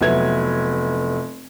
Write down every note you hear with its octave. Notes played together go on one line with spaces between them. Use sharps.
F1 E3 F#3 B3 E5 G#6